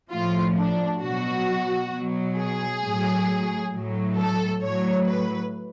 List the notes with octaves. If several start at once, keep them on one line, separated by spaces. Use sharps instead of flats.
A2 F3 F4
D4
B2 F#3 F#4
B2 F#3
G#4
A2 F#3
A2 F#3
A4
A2 F#3 C#5
B4